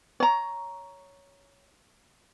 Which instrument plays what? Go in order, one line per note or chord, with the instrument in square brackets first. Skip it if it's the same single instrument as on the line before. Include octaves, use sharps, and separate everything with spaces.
[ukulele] C#5 A#5